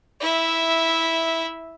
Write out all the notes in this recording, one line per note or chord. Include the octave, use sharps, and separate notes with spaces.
E4 E5